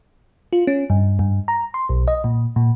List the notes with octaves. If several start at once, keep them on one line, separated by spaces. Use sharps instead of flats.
F4
C#4
G2
G2
A#5
C6
B1
D#5
A#2
A#2